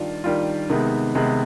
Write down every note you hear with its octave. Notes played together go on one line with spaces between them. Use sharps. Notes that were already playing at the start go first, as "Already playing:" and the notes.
Already playing: D#3 G3 D4 F4
D#3 G3 D4 F4
C3 D#3 G#3 B3
C3 D#3 G#3 B3